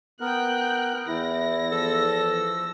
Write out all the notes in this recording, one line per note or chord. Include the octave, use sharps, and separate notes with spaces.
B3 A#4 G5 F#6
E2 E4 A#6
F3 A4 E6